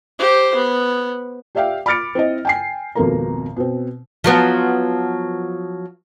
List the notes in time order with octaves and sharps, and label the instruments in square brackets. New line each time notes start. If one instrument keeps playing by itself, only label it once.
[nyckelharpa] G4 C5
B3
[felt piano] G4 D5 E5 F5 G5
B5 D6 F6 A6 C#7 D7
C4 E4 D#5
G5 G#5 C7
G#1 F2 B2 A#3 A4 A#5
B2 C4
[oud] F3 F#3 B3